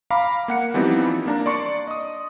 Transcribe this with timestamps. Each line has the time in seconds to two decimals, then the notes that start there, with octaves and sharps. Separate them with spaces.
0.10 F5 A#5 B5 D6
0.48 A#3 F#5 C#7
0.74 E3 F3 G3 B3 C4 D#4
1.26 A#3 D4 A#5
1.46 D5 C6 C#6
1.88 D#5 D#6